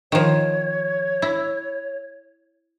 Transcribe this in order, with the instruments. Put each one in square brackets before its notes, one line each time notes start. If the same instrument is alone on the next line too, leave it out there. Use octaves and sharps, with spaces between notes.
[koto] D#3 F3 [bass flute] C#5
[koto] E4